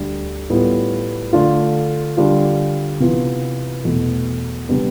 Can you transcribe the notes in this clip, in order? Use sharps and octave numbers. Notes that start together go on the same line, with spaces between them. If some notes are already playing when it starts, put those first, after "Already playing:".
Already playing: D2 D3 G3
A2 G3 B3 F4
D3 A3 D4 F4
D3 G3 D4 F4
C3 E3 B3 F4
E2 B2 A3
C3 G3 B3 D4